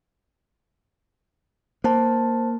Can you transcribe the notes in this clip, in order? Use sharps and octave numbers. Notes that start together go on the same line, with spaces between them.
A#3 C5 A5